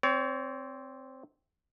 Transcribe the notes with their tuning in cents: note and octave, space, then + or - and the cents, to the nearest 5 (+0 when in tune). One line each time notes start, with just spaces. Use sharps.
C4 +0 C#5 +35